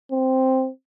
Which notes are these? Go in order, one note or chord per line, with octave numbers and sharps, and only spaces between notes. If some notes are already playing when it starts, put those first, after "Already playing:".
C4